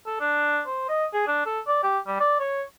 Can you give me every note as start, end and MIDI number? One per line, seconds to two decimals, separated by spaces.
0.06 0.19 69
0.20 0.61 62
0.66 0.89 72
0.89 1.05 75
1.14 1.23 68
1.27 1.43 62
1.46 1.60 69
1.67 1.79 74
1.83 1.99 67
2.07 2.16 55
2.20 2.38 74
2.40 2.63 73